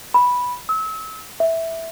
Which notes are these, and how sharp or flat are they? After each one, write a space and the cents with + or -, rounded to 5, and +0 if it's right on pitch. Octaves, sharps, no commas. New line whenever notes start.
B5 -5
E6 -35
E5 -5